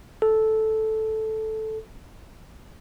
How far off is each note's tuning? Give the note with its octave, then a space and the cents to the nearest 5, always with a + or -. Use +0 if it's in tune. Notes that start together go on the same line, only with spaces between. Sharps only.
A4 -5